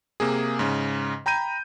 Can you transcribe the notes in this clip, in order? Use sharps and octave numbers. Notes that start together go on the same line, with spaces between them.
C3 A#3 G#4
G#2 C#3
G5 A#5 B5 G6 D#7